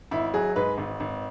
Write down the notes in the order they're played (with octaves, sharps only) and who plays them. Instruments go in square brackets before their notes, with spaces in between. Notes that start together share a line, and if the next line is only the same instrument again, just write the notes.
[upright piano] G#1 E4
F#3 G#4
G#2 B4
G#1
G#1